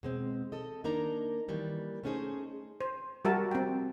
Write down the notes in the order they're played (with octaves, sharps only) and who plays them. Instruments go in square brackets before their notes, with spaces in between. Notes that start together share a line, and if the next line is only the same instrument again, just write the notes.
[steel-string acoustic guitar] B2 G#3 C4
A4 D#5
D#3 A#3 D4 D#4 A#4 A#5
D#3 E3 G3 A#3
A3 B3 C#4 D#4 G#4 C5
[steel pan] C5
G3 F#4 G4 A#4 E5 A5
C4 G5